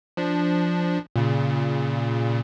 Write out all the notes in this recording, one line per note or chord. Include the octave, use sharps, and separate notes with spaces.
F3 D4
A#2 C#3